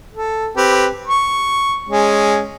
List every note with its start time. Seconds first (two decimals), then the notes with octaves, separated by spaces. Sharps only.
0.14 A4
0.57 C4 G4 B4
1.07 C#6
1.89 G#3 C#4